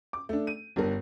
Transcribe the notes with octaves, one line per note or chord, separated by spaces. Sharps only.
D6
A3 D4
D#7
G1 G2 A#4